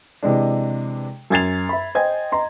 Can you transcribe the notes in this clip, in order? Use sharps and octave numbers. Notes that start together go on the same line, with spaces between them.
C3 E3 G#3 D4
F#2 G#5 G#6 A6 C7 F7
E5 B5
C5 D#5 G5 G#5 G#6
D#5 A#5 C6